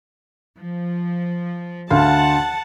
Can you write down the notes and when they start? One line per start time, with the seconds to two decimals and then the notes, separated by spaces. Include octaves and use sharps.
0.56 F3
1.90 D2 F5 F#5 A5 C6